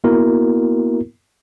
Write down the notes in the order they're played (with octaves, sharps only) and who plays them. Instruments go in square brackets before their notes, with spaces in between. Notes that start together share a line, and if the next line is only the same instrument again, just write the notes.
[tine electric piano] A#3 B3 E4 F#4 A#4